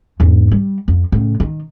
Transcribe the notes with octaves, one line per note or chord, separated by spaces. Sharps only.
E2 G#2
G3
F2
A2 C#3
D#3